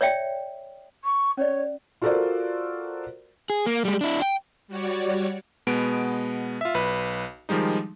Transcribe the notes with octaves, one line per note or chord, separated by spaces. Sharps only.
C#5 D5 E5 G5
C#6
C#4 C#5 D5
F4 F#4 A4 A#4 C5 D5
G#4
A#3
G3 G#3
D4 E4
G5
G3 F#4 C#5 D5
B2 G#3 B3 D7
F4 E5
B1 B4
D#3 F3 G3 G#3 D#4